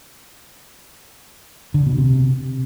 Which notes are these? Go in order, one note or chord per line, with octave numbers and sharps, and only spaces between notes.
D3
B2
C3